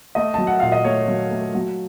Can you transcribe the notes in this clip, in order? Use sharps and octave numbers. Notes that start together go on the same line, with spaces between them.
A3 D#5
F#3 A5
F#5
A#2 F5
D#5
A3 C#5
F#3
A3
F#3